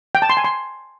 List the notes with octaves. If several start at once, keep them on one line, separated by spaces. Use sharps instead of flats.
G5
A5
C6
G#5
C6